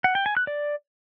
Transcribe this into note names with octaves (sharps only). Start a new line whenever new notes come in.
F#5
G5
G#5
F#6
D5